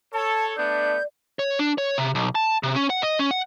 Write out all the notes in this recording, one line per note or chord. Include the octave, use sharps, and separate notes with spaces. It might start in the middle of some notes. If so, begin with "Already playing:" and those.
A4 C#5 A5
A3 B3 D4 D5 G6
C#5
D4
C#5
C3
B1
A5
C3
C#4
F#5
D#5
C#4
F#5